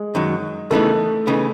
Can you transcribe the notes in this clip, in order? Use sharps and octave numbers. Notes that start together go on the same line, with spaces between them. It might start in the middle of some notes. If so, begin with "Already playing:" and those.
Already playing: G#3
F#2 D#3 F#3
C#3 E3 A3 B3 D#4
C#3 E3 B3 D#4